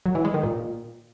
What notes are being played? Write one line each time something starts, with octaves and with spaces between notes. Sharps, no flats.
F#3
E3
G#3
D#3
A#2